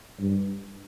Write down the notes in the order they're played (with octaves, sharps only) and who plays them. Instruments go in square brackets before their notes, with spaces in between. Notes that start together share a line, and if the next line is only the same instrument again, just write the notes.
[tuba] G2